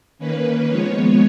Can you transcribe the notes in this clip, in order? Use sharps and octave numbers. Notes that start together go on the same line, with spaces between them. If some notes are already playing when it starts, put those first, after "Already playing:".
D#3 A#3 C#4 B4
F3 G#3 B3 C#5